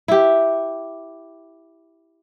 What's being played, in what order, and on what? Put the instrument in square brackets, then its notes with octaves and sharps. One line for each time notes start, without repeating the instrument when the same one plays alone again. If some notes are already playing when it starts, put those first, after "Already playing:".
[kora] E4 G4